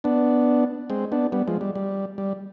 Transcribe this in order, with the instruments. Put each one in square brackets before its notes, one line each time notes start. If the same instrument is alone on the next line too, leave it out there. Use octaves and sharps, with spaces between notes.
[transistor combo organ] B3 D4
G#3 C4
B3 D4
G3 B3
F3 G#3
G3
G3
G3